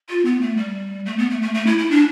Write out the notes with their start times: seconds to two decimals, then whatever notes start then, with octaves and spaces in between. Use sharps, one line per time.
0.09 F4
0.25 B3
0.41 A3
0.57 G3
1.06 A3
1.18 B3
1.30 A3
1.42 A3
1.55 A3
1.66 E4
1.78 E4
1.91 D4